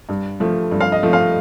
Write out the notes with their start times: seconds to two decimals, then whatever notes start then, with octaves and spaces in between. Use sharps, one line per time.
0.09 G2
0.40 F3 A3
0.71 G2
0.81 F5
0.92 D#5
1.03 F3 A3
1.13 F5